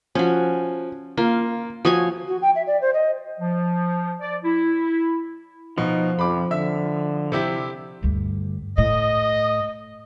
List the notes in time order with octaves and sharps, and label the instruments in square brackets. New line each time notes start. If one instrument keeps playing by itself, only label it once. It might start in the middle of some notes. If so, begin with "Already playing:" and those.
[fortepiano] F3 [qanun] C#4 F#4
[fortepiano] A#3 [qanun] F4
[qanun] F3 C#5 G#5 [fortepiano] F#4 D#6
[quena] F#4
G5
E5
D5
C5
D#5
[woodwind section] F3
D5
E4
[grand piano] B2 [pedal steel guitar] F3 [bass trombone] D#4
[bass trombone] F2 [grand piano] B5 D6
[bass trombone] D3 [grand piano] E5 E6
[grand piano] C3 E4 G4
[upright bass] D2 G2
[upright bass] A2 [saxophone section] D#5